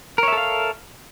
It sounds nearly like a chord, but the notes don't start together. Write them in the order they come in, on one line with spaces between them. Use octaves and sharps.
A#4 C#5 E5 A4 F5